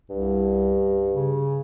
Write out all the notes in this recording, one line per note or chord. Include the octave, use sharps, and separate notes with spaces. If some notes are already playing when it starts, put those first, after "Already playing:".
C2 G2
C#3